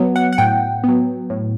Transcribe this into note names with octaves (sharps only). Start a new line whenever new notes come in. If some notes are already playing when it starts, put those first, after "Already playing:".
Already playing: F#3 B3
F#5
F#5
A2 G5
F#3 B3
A2